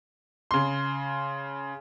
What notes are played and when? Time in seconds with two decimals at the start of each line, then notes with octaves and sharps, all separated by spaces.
0.51 C#3 C6